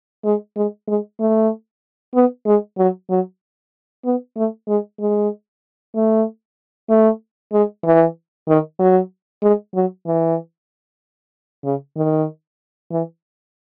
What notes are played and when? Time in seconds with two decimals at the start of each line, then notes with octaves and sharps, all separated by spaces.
0.25 G#3
0.56 G#3
0.88 G#3
1.20 A3
2.15 B3
2.46 G#3
2.78 F#3
3.10 F#3
4.05 B3
4.37 A3
4.68 G#3
5.00 G#3
5.95 A3
6.89 A3
7.53 G#3
7.85 E3
8.48 D#3
8.79 F#3
9.43 G#3
9.75 F#3
10.06 E3
11.64 C#3
11.97 D#3
12.91 E3